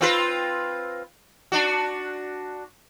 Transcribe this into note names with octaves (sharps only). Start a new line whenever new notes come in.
C4 F4 B4
D4 F#4